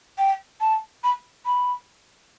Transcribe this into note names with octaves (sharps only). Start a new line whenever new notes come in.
G5
A5
B5
B5